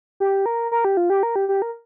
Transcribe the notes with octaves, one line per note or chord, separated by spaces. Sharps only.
G4
A#4
A#4
G4
F4
G4
A#4
G4
G4
A#4